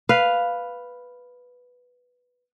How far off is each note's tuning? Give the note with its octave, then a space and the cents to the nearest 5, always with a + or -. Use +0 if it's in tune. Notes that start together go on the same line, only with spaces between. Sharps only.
B4 +0 F5 +0